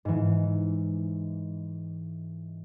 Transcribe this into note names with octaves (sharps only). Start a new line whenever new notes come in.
G#2 E3